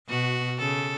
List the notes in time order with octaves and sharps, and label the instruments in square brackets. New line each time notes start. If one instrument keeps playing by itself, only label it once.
[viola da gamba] B2 [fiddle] F#4
[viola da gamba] C#3 [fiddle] A4